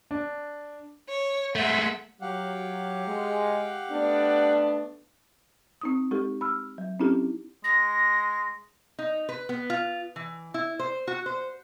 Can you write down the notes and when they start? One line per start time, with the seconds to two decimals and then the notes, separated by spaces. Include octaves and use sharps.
0.11 D4
1.08 C#5
1.55 G#3 A3 E5 F#5
2.21 F#3 G4 F5 F#5
3.07 G#3
3.91 A3 B3 D4
5.81 C4 D#4 D#6
6.11 G#3 D#4 G4 A4
6.41 B5 E6 F6
6.78 F#3
7.00 C4 C#4 D#4 E4 G4 A4
7.64 G#3 A#6
8.99 D#4
9.29 B4
9.49 B3
9.70 F4
10.16 E3
10.54 E4
10.79 C5
11.07 F#4
11.26 C5